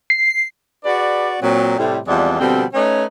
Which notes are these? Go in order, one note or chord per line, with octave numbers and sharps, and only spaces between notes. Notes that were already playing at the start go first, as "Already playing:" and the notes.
C7
F#4 G#4 B4 D5
A#2 F#3 C4
A2 C3 G3
E2 F3 G3 G#3 C4 D5
B2 D3 F3 G3 C4
A3 C#4 D#4 B4 C#5